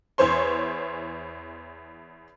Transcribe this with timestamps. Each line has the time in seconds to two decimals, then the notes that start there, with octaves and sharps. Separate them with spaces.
0.18 E2 E3 C5 C#5 C6